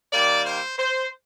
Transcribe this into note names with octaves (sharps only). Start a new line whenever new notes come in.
D#3 G3 A#3 D5
C5
C5